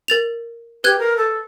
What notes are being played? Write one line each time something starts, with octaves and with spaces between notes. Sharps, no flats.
A#4 A6 F7
G4 B4 F#6 G#6
A#4
A4